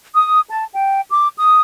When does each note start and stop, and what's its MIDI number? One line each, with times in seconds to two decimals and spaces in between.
0.15 0.41 87
0.49 0.66 81
0.75 1.01 79
1.10 1.28 86
1.37 1.62 87